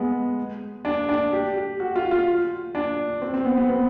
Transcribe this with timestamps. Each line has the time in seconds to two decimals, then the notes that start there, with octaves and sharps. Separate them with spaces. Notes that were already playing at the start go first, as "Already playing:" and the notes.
Already playing: G#3 B3
0.85 D4
1.09 D4
1.32 G4
1.56 G4
1.80 F#4
1.96 F4
2.11 F4
2.75 D4
3.22 C4
3.34 C4
3.45 B3
3.57 B3
3.69 B3